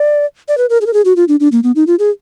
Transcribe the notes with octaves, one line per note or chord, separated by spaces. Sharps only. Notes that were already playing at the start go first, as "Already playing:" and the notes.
Already playing: D5
D5
B4
A#4
G#4
A#4
G#4
F#4
F4
D4
D4
A#3
B3
D#4
F4
G#4